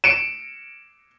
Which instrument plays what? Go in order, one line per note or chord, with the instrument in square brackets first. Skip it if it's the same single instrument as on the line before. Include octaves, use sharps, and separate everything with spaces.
[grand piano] C#7 D7 E7